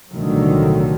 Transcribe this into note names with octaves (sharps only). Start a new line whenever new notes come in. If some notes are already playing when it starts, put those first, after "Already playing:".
C2 A#2 D3 D#3 F#3 A3